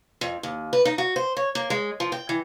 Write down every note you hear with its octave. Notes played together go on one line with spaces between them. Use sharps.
F2
D#2
B4
D#4
F#4
C5
C#5
A#3
G#3
F3
G5
E3